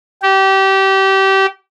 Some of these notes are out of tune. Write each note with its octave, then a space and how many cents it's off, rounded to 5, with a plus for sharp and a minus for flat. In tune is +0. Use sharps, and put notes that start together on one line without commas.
G4 -25